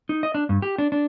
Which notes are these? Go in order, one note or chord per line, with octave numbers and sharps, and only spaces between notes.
D#4
D#5
D4
G2
G4
D4
D4